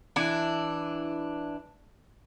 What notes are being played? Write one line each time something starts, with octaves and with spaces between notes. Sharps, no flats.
E3 D4